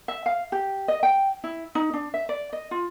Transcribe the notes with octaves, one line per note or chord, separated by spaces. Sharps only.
E5
F5
G4
D#5
G5
E4
D#4
D4
E5
D5
D#5
F4